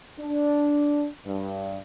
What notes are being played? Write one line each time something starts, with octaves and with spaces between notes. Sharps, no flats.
D4
G2